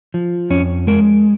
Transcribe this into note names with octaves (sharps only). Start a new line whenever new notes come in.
F3
F2 C#4
G#3 A#4